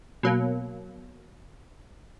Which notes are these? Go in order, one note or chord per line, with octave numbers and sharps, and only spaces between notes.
B2 F#3 A#3